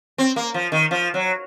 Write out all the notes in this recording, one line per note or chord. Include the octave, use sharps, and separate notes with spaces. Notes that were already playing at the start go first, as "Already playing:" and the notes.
C4
A#3
F3
D#3
F3
F#3